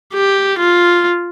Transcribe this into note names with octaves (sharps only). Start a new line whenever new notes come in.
G4
F4